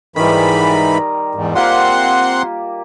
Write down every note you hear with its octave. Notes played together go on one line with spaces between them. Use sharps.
G#2 D#3 E3 G3 B5
A#5
E2 G#2
A#3 C4 F4 G4 F#5 C6